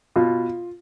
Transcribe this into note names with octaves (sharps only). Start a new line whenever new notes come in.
B2 F4